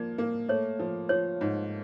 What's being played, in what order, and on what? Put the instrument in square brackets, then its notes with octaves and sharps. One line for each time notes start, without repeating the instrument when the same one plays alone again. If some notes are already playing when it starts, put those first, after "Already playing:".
Already playing: [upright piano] F3 A#3 [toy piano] D5
[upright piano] A#3
[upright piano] A3 [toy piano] C#5
[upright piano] F3
[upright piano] F3 [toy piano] C#5
[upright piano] G#2